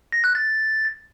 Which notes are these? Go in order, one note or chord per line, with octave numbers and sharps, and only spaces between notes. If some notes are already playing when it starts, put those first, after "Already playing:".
A#6
F#6
A6